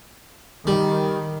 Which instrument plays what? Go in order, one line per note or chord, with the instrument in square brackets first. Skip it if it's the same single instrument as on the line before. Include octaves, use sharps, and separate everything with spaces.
[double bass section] D#3 [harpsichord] G3